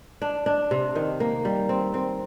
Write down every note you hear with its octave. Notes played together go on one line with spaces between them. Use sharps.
D4
D4
C3
D#3
A#3
G3
C4
C4